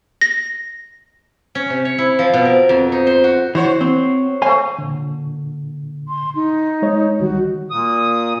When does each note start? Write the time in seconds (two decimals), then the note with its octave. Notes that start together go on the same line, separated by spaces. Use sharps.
0.21 A#6
1.55 C#4
1.70 C3
1.85 C#5
1.98 E4
2.19 F3
2.33 B2
2.45 A#4
2.69 F2
2.92 D#4
3.07 C5
3.24 F#4
3.55 E3 F#4 C5 C#5
3.81 C4
4.42 G3 A3 C5 F5 G#5
4.78 A#2 D3
6.08 C6
6.35 D#4
6.82 G#3 C#5 D#5
7.20 C2 D#3 G3 F#4
7.71 A#2 D#6